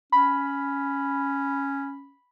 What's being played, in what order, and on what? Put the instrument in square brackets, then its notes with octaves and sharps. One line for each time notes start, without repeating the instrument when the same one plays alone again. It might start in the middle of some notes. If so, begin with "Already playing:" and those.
[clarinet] C#4 [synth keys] B5